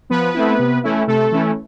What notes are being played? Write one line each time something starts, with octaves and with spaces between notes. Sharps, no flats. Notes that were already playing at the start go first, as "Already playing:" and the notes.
F3 B3 B4
A3 C4 E4
C3
E3 A3 C#4 E4
C3 A3 A4
E3 A3 C#4 E4